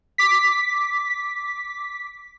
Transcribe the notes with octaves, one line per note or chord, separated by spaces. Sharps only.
D6 B6